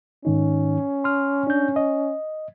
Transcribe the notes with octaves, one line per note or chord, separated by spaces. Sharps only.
G#2 D#3 C#4 D#4
C6 F6
D4 G6
D#5